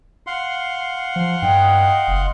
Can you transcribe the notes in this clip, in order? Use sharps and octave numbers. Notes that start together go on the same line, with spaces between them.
F5 F#5 C6
F3
G2 D#5 G5
F#1